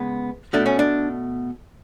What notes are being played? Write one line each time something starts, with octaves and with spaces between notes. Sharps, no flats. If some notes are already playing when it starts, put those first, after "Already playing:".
Already playing: C#3 G#3 B3
B2 A3 D4
C#4
D4